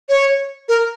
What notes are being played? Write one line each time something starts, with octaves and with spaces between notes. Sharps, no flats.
C#5
A#4